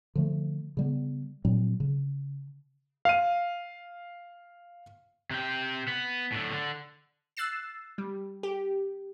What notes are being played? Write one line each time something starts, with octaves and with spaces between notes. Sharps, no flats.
D3 F3 A3
C#3 G3 B3
A#2 F#3 G3 C4
C#3
F5 D#7
C3 G5
B3
A2 D3
D3
E6 F#6 A6 C7 E7
G3
G4